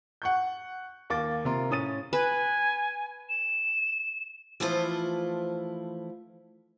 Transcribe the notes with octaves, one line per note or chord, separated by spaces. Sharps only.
F#5 C#6 G6
D#2 A#3 D6 A6
C3 F4 A#4 A#5 C6
A2 C#4 D#6 A6 D#7
B4 G#5
E7
E3 F3 A3 E4 F4 C5